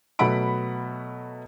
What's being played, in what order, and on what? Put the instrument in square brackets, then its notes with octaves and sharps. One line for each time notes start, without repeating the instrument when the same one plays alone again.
[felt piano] B2 F#3 A3 F#5 B5 D7